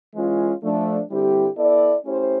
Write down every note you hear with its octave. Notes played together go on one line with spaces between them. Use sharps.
E3 G#3 C#4 F4
F3 A3 D4
D3 G3 C4 E4 G4
B3 E4 A4 D5
A3 C#4 E4 G4 C5